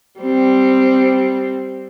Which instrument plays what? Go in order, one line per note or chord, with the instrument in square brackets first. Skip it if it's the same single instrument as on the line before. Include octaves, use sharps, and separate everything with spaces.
[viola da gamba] G3 C4